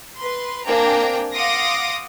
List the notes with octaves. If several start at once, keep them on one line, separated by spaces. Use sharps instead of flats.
B4 C6
A#3 C4 D4 G5 G#5 A#5
F5 F#5 C6 D6 D#6 A#6